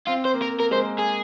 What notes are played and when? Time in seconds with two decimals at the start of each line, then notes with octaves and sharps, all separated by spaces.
0.07 C4 F4
0.25 C5
0.34 A#3
0.42 A#4
0.59 A#3 A#4
0.71 G#3 C5
0.82 A#3
0.98 G#4